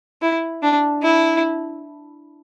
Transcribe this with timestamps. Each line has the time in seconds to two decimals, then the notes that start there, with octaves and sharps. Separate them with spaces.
0.22 E4
0.62 D4
1.03 E4